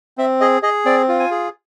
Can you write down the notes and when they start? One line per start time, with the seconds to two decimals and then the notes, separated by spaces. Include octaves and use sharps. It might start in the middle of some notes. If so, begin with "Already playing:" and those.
0.18 C4 E5
0.40 G#4 D#5
0.63 G#4 D#5
0.85 C4 D5
1.08 F4
1.20 G#5
1.31 G#4